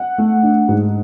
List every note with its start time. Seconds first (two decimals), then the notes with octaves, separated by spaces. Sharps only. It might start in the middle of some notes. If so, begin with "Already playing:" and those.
Already playing: F#5
0.18 A3
0.43 D4
0.69 G#2